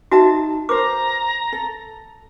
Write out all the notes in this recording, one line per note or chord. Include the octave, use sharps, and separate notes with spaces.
D#4 F#4 E5 A5
A#4 C5 A#5 D6
A4